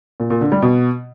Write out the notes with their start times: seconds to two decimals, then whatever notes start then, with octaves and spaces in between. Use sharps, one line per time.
0.20 A#2
0.30 A#2
0.41 D3
0.52 G3
0.62 B2